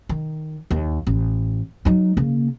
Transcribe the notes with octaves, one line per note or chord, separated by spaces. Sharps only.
D#3
D#2
A1
F#3 D#4
C#3 A#3